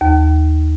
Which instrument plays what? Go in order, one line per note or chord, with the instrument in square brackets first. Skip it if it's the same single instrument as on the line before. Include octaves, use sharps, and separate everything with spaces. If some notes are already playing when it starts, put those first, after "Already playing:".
[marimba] D#2